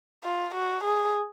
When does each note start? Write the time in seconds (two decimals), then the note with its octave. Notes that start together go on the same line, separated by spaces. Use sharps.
0.24 F4
0.54 F#4
0.83 G#4